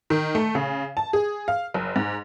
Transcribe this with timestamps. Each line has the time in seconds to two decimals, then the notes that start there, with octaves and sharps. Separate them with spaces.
0.10 D#3
0.35 A3
0.55 C#3
0.97 A5
1.13 G#4
1.48 F5
1.74 F#1
1.96 G#2